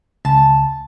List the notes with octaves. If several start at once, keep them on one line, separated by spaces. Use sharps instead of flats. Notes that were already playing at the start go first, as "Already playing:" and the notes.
C#2 A5